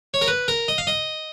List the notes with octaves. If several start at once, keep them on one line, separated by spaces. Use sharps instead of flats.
C#5
A#4
B4
A#4
D#5
F5
D#5